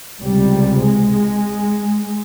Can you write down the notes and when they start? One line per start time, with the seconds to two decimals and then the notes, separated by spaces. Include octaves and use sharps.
0.21 C#2 C3 G3
0.86 G#3